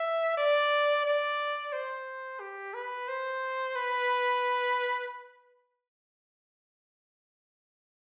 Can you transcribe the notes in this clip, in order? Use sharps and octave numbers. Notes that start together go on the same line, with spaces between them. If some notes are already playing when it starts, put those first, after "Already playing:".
Already playing: E5
D5
D5
C5
G4
B4
C5
B4